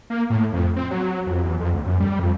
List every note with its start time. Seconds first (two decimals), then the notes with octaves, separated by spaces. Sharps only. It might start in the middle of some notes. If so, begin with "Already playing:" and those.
0.10 A#3
0.30 A2
0.53 F2
0.76 C4
0.91 F#3
1.26 F2
1.44 E2
1.60 F2
1.74 D2
1.85 F#2
2.00 G3
2.19 F2